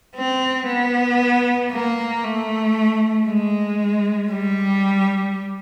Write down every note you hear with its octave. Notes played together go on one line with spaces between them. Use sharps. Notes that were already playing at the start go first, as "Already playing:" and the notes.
C4
B3
A#3
A3
G#3
G3